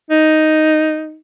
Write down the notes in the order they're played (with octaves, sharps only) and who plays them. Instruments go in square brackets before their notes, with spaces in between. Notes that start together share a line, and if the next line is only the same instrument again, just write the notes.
[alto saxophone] D#4